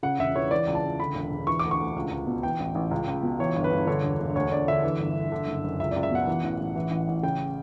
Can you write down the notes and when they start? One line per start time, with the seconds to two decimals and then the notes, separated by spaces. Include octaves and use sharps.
0.03 C#3 F#5
0.19 E1 E5
0.36 E3 C#5
0.51 E3 D5
0.67 C#2
0.75 A5
0.84 C#2
0.99 D3 B5
1.15 E1
1.31 E1
1.47 E3 C#6
1.59 D2 D6
1.71 C#6
1.80 D2
1.96 C#2
2.11 C#2
2.27 B2
2.43 E3 G5
2.60 A1
2.75 A1
2.91 C#2
3.08 C#2
3.23 B2
3.39 E3 C#5
3.56 G1
3.64 B4
3.71 G1
3.87 D3 C#5
4.03 E1
4.20 E1
4.35 D2 C#5
4.51 D2 D5
4.68 D3 E5
4.83 E3
5.00 G1
5.16 G1
5.32 D3
5.47 F#1
5.64 F#1
5.79 C#2 E5
5.91 C#2 D5
6.03 E5
6.11 B2 F#5
6.27 E3
6.44 A1
6.60 A1
6.76 E3
6.91 A1
7.08 A1
7.23 C#3 G5